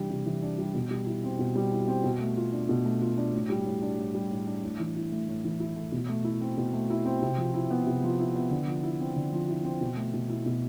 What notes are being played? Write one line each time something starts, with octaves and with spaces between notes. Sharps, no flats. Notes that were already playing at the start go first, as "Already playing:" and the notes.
Already playing: C3 E3 G3 D4
C3
E3
D4
G3
B2
G3
E4
C4
B2
G3
E4
C4
B2
A3
F4
D4
B2
A3
F4
D4
A2
G3
A2
D4
A2
G3
A2
D4
A2
E3
E4
A3
A2
E3
E4
A3
B2
A3
E4
C4
B2
A3
E4
C4
C3
F3
E4
B3
C3
F3
E4
B3
D3
F3
E4
C4
D3
F3
E4
C4
B2
A3
B2
E4
B2